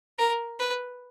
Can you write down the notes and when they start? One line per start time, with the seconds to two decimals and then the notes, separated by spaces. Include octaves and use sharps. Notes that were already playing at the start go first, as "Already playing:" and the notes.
0.18 A#4
0.59 B4